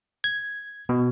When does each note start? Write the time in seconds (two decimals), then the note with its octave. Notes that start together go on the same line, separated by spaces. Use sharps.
0.24 G#6
0.89 B2